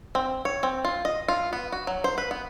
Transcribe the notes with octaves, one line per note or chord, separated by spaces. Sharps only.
C4
C#5
C4
F4
D#5
F4
B3
F#4
F#3
C5
B4
B3